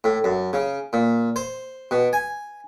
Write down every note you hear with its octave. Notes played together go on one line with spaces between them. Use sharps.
A2
F#2
C#3
A#2
C5
B2
G#5